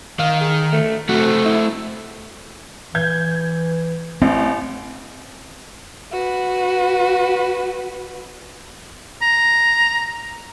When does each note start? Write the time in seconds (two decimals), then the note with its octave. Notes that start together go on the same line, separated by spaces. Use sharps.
0.19 D#3 F5
0.41 G#4
0.72 A3
1.09 A3 C4 F#4
1.45 E4
2.95 E3 G6 G#6
4.22 A1 C4
6.12 F#4 B4
9.22 A#5